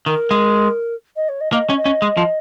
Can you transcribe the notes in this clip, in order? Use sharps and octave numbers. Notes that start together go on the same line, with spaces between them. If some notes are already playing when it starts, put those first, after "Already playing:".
D#3 A#4
G#3
D#5
C#5
D#5
A#3 D#5
C#4
D#5
C#4
G#3
F3